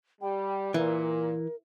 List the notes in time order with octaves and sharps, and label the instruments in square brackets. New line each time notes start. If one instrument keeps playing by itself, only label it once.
[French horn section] G3 [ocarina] G5
[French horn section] A#2 [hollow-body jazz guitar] E3 [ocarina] A#4